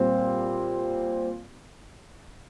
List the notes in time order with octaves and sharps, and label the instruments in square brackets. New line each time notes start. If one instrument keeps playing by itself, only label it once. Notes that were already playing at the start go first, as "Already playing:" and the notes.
Already playing: [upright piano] A#2 G3 C4